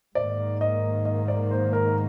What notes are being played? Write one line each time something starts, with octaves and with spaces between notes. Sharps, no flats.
G#2 D#3 A#3 D5
D#5
D#5
D5
C5
A#4